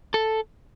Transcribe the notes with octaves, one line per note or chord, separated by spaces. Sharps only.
A4